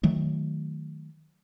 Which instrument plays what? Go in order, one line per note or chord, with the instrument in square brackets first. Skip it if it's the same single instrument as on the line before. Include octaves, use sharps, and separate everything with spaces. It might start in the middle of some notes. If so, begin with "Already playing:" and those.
[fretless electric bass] D#3 F#3 A3